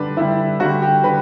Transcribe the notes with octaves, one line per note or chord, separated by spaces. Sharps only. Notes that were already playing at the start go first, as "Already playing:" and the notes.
Already playing: D3 G3 D4 B4
D3 G3 E4
D3 G3 F#4
G4
D3 B4